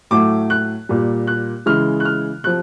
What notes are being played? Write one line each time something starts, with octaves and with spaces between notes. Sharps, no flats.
A2 F#3 A3 D6
F#6
A#2 G3
F#6
C#3 E3 G#3 F6
F#6
F6
C3 F3 F#6